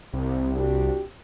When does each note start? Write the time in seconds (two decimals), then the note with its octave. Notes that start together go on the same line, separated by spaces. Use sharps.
0.14 C2 C3
0.55 D4 F#4 G4